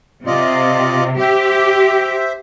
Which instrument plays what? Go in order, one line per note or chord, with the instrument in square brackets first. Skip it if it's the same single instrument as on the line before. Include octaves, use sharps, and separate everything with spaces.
[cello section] C3 [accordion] F4 D5 D#5
[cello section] G4 [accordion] C5 E5